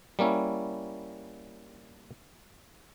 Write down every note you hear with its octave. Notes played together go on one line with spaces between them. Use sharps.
G3 A#3 C#4 E4